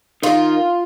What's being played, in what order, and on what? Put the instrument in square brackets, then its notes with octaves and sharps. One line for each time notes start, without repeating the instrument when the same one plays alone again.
[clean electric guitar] D#3 [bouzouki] F4